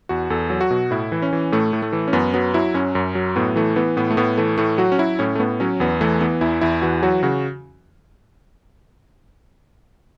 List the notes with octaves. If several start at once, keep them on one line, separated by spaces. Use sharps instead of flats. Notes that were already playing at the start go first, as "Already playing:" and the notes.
E2 F#4
E2 A4
F#3
F#4
B2
A2 E4
E3
C#4
E3
A2 A3
A2
A3
E3
C#4
F#2 B3
F#3 B3
F#3 E4
F#2 C#4
F#2
F#3
A2 B3
E3 A3
E3 B3
A2 B3
A3
A2 B3
E3 A3
A2 A3
F#3 F#4
C#4
F#3 E4
A2 C#4
A3
A2 B3
F#3 C#4
E2 B3
E3 A3
E3 B3
E2 E4
E2 E4
E3 F#4
F#3 F#4
C#3 F#4